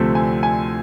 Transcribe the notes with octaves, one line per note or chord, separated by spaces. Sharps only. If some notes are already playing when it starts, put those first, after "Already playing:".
Already playing: D2 C3 F3 A3 C4
G#5
G#5